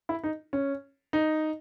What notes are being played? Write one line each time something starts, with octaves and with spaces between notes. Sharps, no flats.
E4
D#4
C#4
D#4